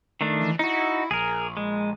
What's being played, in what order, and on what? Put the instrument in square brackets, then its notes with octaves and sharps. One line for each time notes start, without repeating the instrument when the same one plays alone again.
[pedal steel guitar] D#3 A3 D4
[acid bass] E3
[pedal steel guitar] D#4 F#4 [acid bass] E4
[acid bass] A#1 [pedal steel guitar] G#4 A#4
[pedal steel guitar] G#3